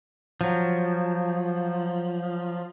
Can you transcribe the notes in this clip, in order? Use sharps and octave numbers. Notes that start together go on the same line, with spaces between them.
F3 F#3